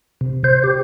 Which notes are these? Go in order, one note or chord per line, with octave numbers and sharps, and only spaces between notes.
C3
C5
G4